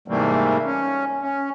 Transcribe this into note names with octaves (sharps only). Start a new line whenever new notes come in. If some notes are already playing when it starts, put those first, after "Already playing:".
G#2 C3 E3 G3 A3 A#3
C#4
C#4